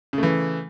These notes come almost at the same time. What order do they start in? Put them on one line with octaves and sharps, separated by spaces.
C#3 A3 E3